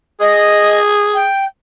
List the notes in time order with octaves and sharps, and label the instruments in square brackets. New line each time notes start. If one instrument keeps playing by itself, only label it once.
[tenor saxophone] G#4 [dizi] D#5
[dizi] G5